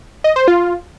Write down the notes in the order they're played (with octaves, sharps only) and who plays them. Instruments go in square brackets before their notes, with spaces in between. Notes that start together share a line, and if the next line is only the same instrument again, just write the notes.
[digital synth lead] D#5
C5
F4